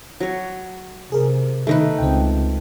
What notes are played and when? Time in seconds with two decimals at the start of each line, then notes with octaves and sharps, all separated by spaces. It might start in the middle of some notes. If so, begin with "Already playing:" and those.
0.20 F#3 C#5
1.12 C3 G#4 A#4
1.67 B2 D#3 A3 D#4 B4
1.98 C#2 C4 G5